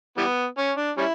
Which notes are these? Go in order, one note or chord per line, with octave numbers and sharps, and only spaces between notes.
E3 G3 B3
C#4
D4
G3 C#4 E4